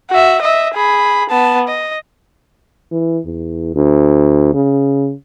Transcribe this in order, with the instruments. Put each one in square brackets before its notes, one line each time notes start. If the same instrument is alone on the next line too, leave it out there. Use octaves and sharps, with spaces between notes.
[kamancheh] F#4 E5
D#5 E5
G#4 B5
B3 A5
D#5
[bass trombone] E3
E2
D2
C#3